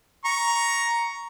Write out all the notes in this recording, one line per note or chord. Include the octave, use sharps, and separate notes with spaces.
A#5 C#6